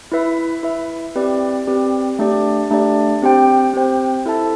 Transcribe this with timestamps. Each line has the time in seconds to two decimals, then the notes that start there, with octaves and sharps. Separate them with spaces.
0.12 E4 B4 E5
0.63 E4 B4 E5
1.15 C4 G4 B4 D5
1.67 C4 G4 B4 D5
2.19 A3 D4 G4 D5
2.71 A3 D4 G4 D5
3.22 C4 G4 C5 G5
3.74 C4 G4 C5 G5
4.26 E4 A4 E5 A5